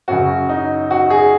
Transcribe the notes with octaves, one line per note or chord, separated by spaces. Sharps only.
F#2 C#3 F#4
D#4
F#4
G#4